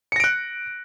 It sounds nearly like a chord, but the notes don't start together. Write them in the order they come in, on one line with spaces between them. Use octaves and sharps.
C#7 A#6 D7 F#6